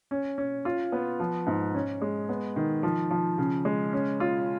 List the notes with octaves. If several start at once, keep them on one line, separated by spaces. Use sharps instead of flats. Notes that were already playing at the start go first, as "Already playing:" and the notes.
C#4
C#4
F4
B3
F3
G#2
C#4
G#3
B3
D#3
F3
F3
C#3
G#3
C#4
F4